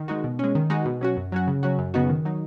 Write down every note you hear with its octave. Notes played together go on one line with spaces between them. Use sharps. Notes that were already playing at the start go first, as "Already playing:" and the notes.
Already playing: D#3
G#3 D#4 F#4
B2
G#3 C#4
D#3
G#3 D#4 F#4
B2
F#3 C#4 F#4
F#2
F#3 C#4 F#4
C#3
F#3 C#4 F#4
F#2
C#3 B3 D#4 F#4
D#3
F#3 D#4